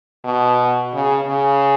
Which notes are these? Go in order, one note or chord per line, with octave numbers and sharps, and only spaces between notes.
B2
C#3
C#3